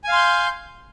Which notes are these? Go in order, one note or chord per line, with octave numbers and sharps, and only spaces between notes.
F5 G#5 C6 G6